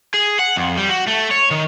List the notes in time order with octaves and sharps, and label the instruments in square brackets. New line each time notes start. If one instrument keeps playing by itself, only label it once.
[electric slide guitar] G#4
F#5
F2
G3
F#4
A3
C#5
D#3